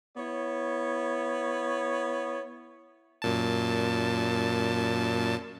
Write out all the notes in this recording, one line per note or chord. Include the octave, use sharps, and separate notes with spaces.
B3 E4 C#5
F#2 A#2 A5